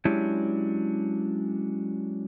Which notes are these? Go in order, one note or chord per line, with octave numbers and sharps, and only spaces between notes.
F#3 G#3 C#4 D4 E4 G4